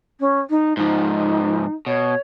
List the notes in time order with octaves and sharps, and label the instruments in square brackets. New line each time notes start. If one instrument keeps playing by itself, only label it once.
[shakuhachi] C#4
D#4
[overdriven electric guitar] G#2 F3 [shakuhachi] D#4
[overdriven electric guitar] B2 [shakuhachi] C#5